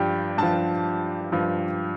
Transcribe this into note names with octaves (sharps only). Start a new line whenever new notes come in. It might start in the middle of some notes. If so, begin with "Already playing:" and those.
Already playing: G2 F3 D4 G4
G2 F3 A5
G2 F3